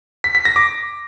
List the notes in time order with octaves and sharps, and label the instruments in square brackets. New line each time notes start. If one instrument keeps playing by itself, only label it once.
[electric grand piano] B6
B6
A#6
D6